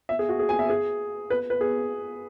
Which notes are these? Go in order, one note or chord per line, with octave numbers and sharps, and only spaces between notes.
E5
G#4
F#4
G#4
G#5
E5
G#4
B4
B4
G#4